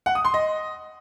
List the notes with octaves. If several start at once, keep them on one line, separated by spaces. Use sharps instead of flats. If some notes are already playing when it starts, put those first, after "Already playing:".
F#5
D#6
C6
D#5